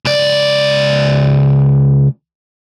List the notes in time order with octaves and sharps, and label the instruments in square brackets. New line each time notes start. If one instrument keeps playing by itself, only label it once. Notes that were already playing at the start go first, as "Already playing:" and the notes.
[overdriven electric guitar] C#2 D5